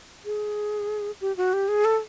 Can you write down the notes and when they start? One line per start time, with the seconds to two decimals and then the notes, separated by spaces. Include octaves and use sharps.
0.25 G#4
1.21 G4
1.37 F#4
1.53 G4
1.68 G#4
1.85 A4